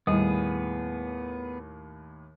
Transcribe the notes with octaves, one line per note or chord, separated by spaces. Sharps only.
D#2 A2 G3 B3 G#4